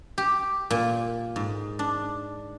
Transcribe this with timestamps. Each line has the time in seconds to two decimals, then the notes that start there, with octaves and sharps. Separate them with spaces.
0.18 G4
0.70 A#2
1.36 G#2
1.79 D4